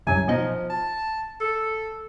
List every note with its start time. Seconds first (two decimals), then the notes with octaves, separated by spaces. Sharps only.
0.07 C2 F#2 G#5
0.28 B2 F3 D#4
0.70 A5
1.41 A4